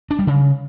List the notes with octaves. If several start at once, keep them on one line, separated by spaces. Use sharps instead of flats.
D4
G3
C#3